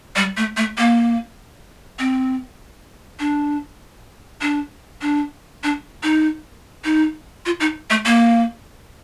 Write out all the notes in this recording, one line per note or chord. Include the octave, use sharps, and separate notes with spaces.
G3
A3
A3
A#3
C4
D4
D4
D4
D4
D#4
D#4
F4
D#4
A3
A#3